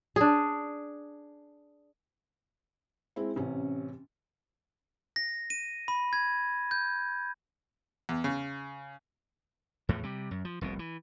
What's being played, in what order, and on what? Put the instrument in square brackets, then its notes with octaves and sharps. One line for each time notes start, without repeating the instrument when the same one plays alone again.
[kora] D4 G#4
[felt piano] G#3 C4 E4
A1 C3 C#4
[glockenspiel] A#6
D#7
B5
G#6
G6
[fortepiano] E2
C#3
[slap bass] E2 A2 F3
C3 G3
F#2
F3
F1 C2 B2
E3